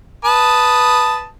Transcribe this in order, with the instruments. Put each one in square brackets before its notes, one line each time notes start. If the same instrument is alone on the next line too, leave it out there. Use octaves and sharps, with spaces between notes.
[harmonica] B4 A5 D#6